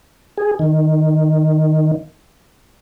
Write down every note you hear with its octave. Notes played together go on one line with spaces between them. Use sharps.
G#4
D#3